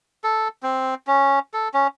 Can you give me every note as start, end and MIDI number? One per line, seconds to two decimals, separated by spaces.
0.24 0.48 69
0.63 0.95 60
1.07 1.39 61
1.54 1.68 69
1.74 1.87 61